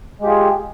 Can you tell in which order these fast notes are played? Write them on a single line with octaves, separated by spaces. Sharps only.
G#3 G4 F4 G#4